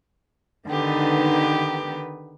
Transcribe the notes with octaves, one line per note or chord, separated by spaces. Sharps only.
D3 D#3 B3 D#4 G4 B4